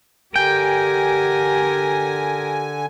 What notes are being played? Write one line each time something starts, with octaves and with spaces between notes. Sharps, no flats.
D3 G4 A#4 G5 G#5